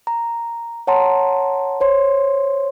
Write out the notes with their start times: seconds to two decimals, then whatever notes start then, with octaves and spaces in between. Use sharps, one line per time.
0.07 A#5
0.87 C#5 F#5 A5 A#5 C6
1.81 C5 C#5 C6